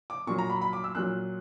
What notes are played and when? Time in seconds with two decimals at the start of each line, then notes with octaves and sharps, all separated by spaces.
0.10 D6
0.27 A#2 F#3 C#6
0.38 A#5
0.49 B5
0.61 B5
0.73 D6
0.84 E6
0.95 A#2 F#3 F#6